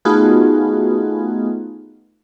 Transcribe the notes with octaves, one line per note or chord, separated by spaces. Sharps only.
A3 B3 D#4 F4 F#4 G#4